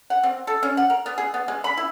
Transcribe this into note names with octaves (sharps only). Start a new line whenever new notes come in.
F#5
C4
A4
C#4
F#5
A#4
B3
G#4
B3
G#3
B5
E4